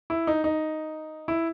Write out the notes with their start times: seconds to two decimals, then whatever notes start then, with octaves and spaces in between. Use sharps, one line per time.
0.10 E4
0.27 D#4
0.44 D#4
1.28 E4